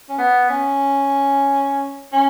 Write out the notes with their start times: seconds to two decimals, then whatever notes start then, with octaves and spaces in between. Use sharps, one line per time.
0.09 C#4
0.18 B3
0.49 C#4
2.12 C#4